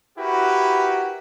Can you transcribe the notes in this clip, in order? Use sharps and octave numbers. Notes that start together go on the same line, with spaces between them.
E4 F#4 G4 A#4 B4